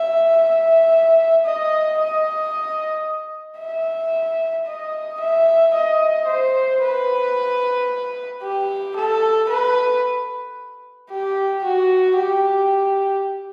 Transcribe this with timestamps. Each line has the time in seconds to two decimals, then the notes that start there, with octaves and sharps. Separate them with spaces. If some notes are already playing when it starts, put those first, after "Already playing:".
Already playing: E5
0.38 E5
1.45 D#5
1.98 D#5
3.60 E5
4.66 D#5
5.20 E5
5.73 D#5
6.28 C5
6.81 B4
8.43 G4
8.96 A4
9.49 B4
11.10 G4
11.64 F#4
12.17 G4